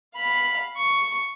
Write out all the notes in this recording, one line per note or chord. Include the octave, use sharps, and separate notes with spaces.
F5 B5
C#6